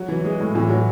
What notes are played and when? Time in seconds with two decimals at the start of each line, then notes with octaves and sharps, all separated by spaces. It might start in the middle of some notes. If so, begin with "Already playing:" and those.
Already playing: F#3
0.09 E3
0.25 G#3
0.40 A2
0.55 A2 E3
0.69 F#3